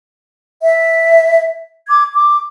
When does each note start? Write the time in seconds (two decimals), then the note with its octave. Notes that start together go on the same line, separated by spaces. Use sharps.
0.62 E5
1.88 D6 G#6
2.13 D6